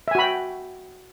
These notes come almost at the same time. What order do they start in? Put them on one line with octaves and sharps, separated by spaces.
E5 G#5 F#4 B5 G5